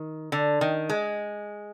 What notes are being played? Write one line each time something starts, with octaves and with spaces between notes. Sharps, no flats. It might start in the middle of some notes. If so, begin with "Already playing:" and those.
Already playing: D#3
D3
D#3
G#3